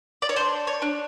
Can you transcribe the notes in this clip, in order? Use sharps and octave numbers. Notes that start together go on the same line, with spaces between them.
D5
C#5
D4 C5
C#5
D4